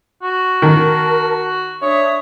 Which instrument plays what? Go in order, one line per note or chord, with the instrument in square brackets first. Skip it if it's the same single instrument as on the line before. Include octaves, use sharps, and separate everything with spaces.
[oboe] F#4
[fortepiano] D#3 [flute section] A#4 A5
[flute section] C#6
[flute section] D4 E5 D#6 [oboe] C#5